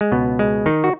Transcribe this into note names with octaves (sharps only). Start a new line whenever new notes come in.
G#3
C#2 B2 B3
G#3
D#3 D#4
F#4